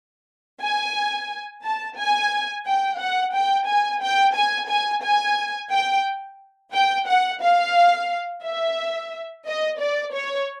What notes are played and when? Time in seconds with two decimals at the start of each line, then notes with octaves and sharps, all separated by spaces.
0.62 G#5
1.64 A5
1.97 G#5
2.66 G5
3.00 F#5
3.35 G5
3.68 G#5
4.02 G5
4.35 G#5
4.70 G#5
5.04 G#5
5.72 G5
6.74 G5
7.08 F#5
7.43 F5
8.44 E5
9.47 D#5
9.80 D5
10.14 C#5